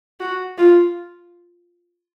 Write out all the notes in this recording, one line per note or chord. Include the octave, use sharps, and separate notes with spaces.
F#4
F4